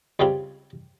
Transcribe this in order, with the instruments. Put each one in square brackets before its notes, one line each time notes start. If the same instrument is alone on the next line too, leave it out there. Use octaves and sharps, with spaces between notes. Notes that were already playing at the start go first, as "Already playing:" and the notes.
[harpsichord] C#2 C#3 G3 C4 F4